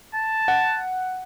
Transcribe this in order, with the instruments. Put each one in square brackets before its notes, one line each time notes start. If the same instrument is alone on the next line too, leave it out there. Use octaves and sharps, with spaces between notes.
[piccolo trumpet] A5
[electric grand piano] F#5